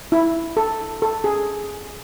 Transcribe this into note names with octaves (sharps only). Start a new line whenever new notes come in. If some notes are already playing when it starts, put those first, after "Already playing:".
E4
A4
A4
G#4